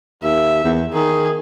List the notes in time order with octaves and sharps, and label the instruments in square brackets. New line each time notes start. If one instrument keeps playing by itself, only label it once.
[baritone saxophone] D#2 [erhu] E5
[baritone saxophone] E2
[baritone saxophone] D#3 [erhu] G#4